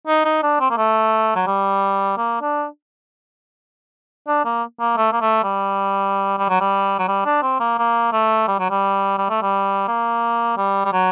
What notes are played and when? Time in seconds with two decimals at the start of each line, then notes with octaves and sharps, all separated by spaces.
0.07 D#4
0.25 D#4
0.43 D4
0.60 C4
0.71 A#3
0.77 A3
1.36 F#3
1.47 G3
2.18 A#3
2.41 D4
4.28 D4
4.45 A#3
4.80 A#3
4.97 A3
5.13 A#3
5.21 A3
5.44 G3
6.38 G3
6.49 F#3
6.60 G3
6.99 F#3
7.08 G3
7.25 D4
7.42 C4
7.60 A#3
7.78 A#3
8.13 A3
8.48 G3
8.59 F#3
8.70 G3
9.18 G3
9.30 A3
9.42 G3
9.88 A#3
10.57 G3
10.85 G3
10.93 F#3